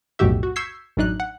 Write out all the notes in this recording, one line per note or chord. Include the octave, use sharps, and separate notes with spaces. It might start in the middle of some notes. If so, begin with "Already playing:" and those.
B1 F2 A2 F#4 G4 E5
F#4
C#6 E6 G6 G#6 B6 C7
A1 F#2 D4 D#4 F#6
F#5